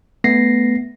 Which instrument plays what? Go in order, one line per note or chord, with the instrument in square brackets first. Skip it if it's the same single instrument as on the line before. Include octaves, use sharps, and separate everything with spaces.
[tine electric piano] A3 B3 A#6 C7